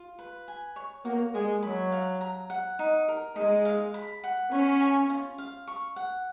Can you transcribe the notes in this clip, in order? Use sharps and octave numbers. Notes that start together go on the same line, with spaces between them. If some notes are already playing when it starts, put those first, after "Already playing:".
Already playing: F4
B4
G#5
C#5
A#3 F#4
G#3 G#5
F#3 B5
F5
A#5
F#5
D#4
A#4
G#3 D#4
F5
B5
F#5
C#4 B5
G#5
F4
F5
C#6
F#5